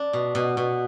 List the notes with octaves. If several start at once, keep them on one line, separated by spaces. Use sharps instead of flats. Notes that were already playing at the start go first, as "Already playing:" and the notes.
Already playing: D4
B2
B2
B2